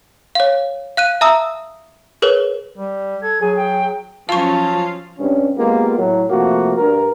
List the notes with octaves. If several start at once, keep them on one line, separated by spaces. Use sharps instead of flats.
C#5 F5
F5 F#6 D#7
E5 A5 A#5 D#6 E6
G#4 A#4 B4 C#5
G3
A4 G#6
F#3 G#4 G#5
G5
F3 F#3 C#4 F4 F5 A5 C#6
G2 C3 C#4
G#3 A#3 B3 F4 G4 A#4
A2 F#3
C3 F3 A3 A#3 F#4
G2 A#4